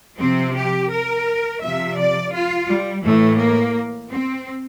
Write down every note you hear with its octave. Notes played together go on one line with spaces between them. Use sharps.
C3 F3 C4
G4
A#4
C3 F3 E5
D5
F4
G3
A2 E3 A3
A#3
C4